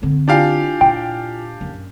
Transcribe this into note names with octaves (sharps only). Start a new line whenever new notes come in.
D3 C4
D4 E4 F4 G4 F5 G#5
A#2 G5
F#2